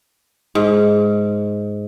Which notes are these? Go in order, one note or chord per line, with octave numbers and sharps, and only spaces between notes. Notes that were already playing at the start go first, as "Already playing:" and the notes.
G#2